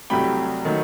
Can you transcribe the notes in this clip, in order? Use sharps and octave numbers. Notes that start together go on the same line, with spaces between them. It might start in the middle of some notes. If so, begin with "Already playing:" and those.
C2 C3 F#3 A3 G5 B5
D#3 F#3 A3